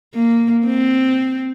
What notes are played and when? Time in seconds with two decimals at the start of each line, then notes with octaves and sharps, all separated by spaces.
0.15 A#3
0.66 C4